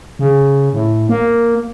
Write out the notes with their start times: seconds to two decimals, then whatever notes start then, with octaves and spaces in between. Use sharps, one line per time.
0.19 C#3
0.73 A2
1.09 A#3